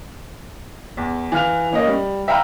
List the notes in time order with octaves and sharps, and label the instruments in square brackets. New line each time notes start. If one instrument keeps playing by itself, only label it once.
[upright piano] E2
E3 F5 F6 F7
A#3 C#4 D#5
G3
E5 F5 G5 A#5 B5 F6